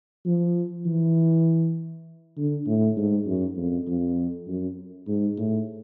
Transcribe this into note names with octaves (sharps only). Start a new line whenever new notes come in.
F3
E3
D3
A2
G#2
F#2
F2
F2
F#2
G#2
A2